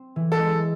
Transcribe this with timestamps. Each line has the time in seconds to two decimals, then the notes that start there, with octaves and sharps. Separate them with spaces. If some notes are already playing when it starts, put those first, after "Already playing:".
Already playing: C4
0.16 E3
0.32 A4
0.39 G#3